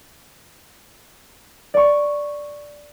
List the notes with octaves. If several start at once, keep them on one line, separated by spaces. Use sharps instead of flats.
D5 C#6